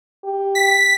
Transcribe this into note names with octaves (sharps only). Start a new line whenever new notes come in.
G4
B6